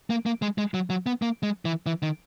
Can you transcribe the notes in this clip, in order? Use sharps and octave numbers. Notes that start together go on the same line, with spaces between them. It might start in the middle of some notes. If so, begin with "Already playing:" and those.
A#3
A#3
G#3
G#3
F#3
F#3
B3
A#3
G#3
E3
E3
D#3